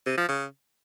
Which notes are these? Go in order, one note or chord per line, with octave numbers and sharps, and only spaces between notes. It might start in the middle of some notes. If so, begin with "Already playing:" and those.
C3
F3
C#3